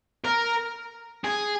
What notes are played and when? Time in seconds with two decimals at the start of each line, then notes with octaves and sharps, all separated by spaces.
0.25 A#4
1.24 G#4